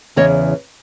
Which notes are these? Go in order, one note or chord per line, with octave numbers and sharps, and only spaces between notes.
E2 C#3 E3 C#5 D#5